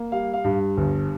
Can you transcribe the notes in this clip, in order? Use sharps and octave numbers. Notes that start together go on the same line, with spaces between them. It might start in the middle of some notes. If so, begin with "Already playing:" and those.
Already playing: A#3
G3 F5
F5
G2
G1